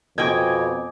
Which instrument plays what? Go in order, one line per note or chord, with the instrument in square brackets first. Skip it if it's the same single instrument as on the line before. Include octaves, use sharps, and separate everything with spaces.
[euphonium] F2 [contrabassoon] B2 [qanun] D#5 G5 G#5 [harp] D6 G#6